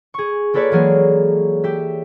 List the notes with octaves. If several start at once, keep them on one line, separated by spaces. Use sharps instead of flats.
G#4 C#6
A#3 F4 A4 B4 C#5 D5
E3 F#3 G#3 A#3 G#4 A4
G4 E5